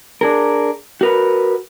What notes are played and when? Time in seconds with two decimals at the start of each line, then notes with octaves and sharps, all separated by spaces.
0.21 D4 G#4 A#4
1.01 F#4 A#4 B4